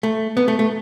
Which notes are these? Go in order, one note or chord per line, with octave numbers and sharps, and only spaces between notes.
A3
B3
A3
A3